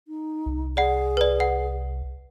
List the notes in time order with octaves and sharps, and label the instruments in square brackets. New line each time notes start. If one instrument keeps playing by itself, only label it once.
[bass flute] D#4
[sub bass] C2
[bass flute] G#4 [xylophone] D5 F#5
[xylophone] B4 D5
F#5